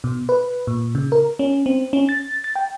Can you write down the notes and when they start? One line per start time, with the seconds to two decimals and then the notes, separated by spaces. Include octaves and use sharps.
0.04 B2
0.29 B4
0.67 A#2
0.95 C#3
1.12 A#4
1.39 C#4
1.66 C4
1.93 C#4
2.09 A6
2.44 A6
2.55 G5